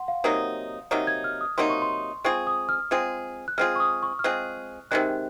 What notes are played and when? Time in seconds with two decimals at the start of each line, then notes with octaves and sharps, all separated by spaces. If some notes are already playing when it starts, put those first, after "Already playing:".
Already playing: F#5 C6
0.08 F5
0.24 C3 F#3 A#3 D#4 D#6
0.91 C3 F#3 A#3 D#4
1.07 G#6
1.24 F6
1.41 D#6
1.58 C3 F#3 A#3 D#4 C6
1.70 C#6
1.82 C6
2.24 G#3 C4 F4 G#4 C#6
2.47 D#6
2.69 F6
2.91 G#3 C4 F4 G#4
3.48 F#6
3.58 G#3 C4 F4 G#4 F6
3.76 C#6
3.80 D#6
4.03 C#6
4.19 F6
4.24 G#3 C4 F4 G#4 F#6
4.91 C3 D#3 G#3 F#6